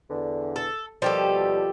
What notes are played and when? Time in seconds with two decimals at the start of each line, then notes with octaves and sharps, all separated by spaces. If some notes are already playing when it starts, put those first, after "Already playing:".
0.10 E2 D3
0.56 A4
1.02 D#2 B2 F3 G3 G4 A4